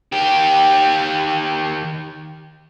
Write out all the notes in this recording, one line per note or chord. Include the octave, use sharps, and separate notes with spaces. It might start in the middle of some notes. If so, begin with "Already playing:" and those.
D#3 G4